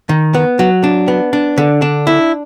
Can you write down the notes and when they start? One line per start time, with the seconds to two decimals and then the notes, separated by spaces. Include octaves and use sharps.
0.09 D#3
0.34 B3
0.59 F#3
0.84 D4
1.08 B3
1.33 D4
1.58 D3
1.82 D4
2.07 E4